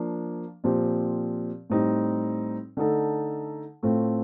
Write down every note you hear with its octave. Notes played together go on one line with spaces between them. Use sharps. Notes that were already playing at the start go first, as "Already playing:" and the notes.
Already playing: F3 A#3 D4
A#2 F3 C4 G4
A2 G3 C4 D#4
D3 A3 D#4 A4
A2 A3 C4 F4